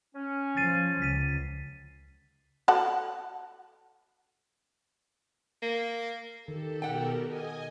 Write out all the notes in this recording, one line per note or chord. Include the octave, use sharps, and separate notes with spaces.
C#4
F3 A6 C7 D#7
C#2 B6 D#7
F#4 A4 F#5
A#3
D#3 G4 A4
B2 A#4 F#5 G5
D#5 G#5